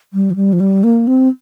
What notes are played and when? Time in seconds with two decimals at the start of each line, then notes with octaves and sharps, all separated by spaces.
0.13 G3
0.31 F3
0.36 G3
0.53 F3
0.60 G3
0.84 A#3
1.07 C4